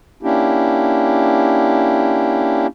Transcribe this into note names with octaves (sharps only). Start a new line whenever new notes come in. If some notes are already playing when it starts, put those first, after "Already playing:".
A#3 C#4 D4 E4 G4